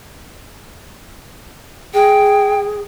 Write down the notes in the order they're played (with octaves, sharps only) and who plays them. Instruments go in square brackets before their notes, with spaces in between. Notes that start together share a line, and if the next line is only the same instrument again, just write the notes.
[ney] G#4 [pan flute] G5